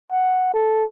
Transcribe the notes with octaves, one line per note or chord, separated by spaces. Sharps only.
F#5
A4